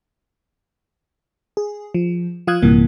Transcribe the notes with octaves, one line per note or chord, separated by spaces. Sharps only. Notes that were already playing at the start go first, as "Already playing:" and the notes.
G#4
F3
F3 F4 F5 D#6 F#6 G#6
A#1 G2 C3 E3 A#3